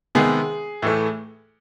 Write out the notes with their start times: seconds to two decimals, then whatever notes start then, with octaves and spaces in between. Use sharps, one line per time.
0.15 C3 D#3 G#3 B3 G#4
0.82 A2 E3 A3